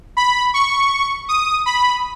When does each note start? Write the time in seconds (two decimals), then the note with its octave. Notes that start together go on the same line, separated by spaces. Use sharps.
0.17 B5
0.54 C#6
1.29 D#6
1.66 B5